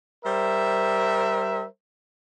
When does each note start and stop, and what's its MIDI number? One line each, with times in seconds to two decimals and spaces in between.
0.24 1.64 55
0.24 1.64 70
0.24 1.64 72
0.24 1.64 76